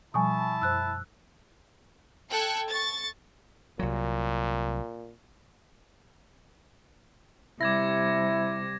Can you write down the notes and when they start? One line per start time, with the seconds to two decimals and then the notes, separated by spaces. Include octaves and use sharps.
0.14 B2 F3 G3 E4 G#5 A5 C#6 D#6
0.62 F#2 C5 E6 F#6
2.30 A4 G5 A5 F#6 G#6 C#7
2.69 C#6 A6
3.79 C2 A#2 F#3
7.61 C3 G3 E4 D6 G#6 A#6